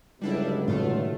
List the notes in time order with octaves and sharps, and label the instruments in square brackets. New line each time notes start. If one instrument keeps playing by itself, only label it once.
[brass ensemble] G1 C#2 F#3 [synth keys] G3 D4 E4
[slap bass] A2 C3 D#3 [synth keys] A3 F4